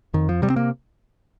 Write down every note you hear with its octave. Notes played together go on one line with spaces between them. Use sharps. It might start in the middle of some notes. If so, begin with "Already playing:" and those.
F2 D#3
F3
C3 G3
C4
A#3